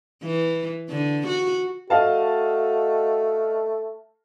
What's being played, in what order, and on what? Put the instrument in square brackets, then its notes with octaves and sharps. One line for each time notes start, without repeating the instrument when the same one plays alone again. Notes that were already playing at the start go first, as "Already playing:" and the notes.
[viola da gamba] E3
D3
F#4
[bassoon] A3 [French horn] F#4 [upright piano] D#5 F5 A5